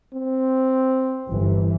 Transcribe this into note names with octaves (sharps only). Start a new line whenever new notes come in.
C4
G1 E3